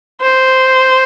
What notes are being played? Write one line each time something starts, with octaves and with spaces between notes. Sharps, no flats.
C5